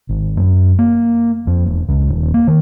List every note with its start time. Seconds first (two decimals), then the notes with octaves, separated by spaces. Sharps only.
0.09 G#1
0.37 F#2
0.79 A#3
1.47 F2
1.66 E1
1.89 C#2
2.09 D#1
2.34 A#3
2.47 D#3